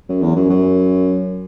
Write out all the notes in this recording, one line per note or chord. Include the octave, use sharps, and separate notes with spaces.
F#2
E2
F#2
F#2